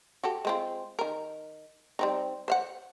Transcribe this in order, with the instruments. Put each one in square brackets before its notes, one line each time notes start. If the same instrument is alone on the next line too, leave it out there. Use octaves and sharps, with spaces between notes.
[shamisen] F#4 G4 A4
G#3 C4 F4
D#3 A#4
G3 C4 D#4
C5 F5 F#5